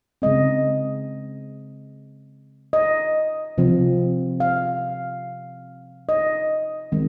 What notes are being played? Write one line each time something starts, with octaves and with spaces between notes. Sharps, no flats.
C#3 G#3 C4 D#5
D#5
C3 F3 C4
F5
D#5
D#3 G#3 C4